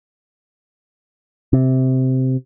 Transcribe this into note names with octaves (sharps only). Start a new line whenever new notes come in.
C3